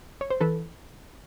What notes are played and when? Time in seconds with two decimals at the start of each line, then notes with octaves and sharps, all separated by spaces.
0.21 C#5
0.30 C5
0.41 E3 A4 B4